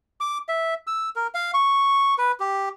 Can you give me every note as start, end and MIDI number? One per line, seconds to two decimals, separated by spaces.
0.21 0.38 86
0.49 0.74 76
0.87 1.09 88
1.16 1.27 70
1.35 1.51 77
1.54 2.14 85
2.18 2.32 71
2.40 2.69 67